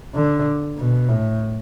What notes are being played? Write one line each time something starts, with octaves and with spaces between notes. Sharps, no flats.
D3
B2
A2